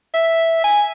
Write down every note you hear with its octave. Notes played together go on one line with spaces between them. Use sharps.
E5
G#5